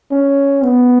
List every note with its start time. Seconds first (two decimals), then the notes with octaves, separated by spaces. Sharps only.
0.11 C#4
0.63 B3